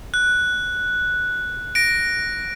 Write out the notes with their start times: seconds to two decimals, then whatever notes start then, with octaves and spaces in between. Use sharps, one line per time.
0.14 F#6
1.75 A#6 D7